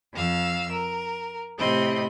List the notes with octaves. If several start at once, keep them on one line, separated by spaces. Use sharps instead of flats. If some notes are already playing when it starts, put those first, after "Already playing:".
F2 F5 E6
A#4
A2 C3 C4 D#5 B5